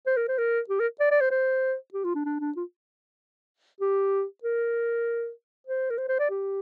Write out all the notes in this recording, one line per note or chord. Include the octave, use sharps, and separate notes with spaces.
C5
A#4
C5
A#4
G4
A#4
D5
D5
C5
C5
G4
F4
D4
D4
D4
F4
G4
A#4
C5
A#4
C5
C5
D5
G4